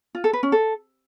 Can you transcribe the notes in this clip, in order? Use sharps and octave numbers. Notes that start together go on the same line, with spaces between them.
F4
A4
B4
C#4
A4